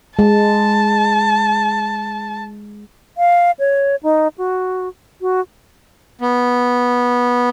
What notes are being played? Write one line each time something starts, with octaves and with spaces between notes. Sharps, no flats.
G#3 A5
F5
C#5
D#4
F#4
F#4
B3